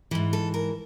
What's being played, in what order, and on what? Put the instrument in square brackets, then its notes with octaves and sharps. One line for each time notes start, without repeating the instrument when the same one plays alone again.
[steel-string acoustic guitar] G#2 E3
A4
A#4